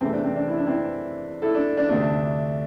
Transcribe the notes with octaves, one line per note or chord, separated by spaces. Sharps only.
E2 C3 E3 A3 C4
D4
C4
D4
E4
D4
C4 E4
E4 A4
D4
D4
D2 C3 A3 D4